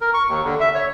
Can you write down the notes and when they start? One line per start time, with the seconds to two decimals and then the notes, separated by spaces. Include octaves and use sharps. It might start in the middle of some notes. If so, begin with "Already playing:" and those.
0.01 A#4
0.14 C#6
0.28 D#2
0.44 D3
0.60 E5
0.75 C#5